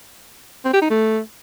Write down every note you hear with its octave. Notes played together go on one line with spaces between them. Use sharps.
C4
G4
D#4
A3